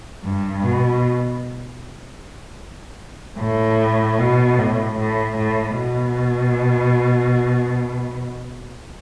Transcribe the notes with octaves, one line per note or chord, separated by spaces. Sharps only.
G2
B2
A2
B2
A2
A2
A2
B2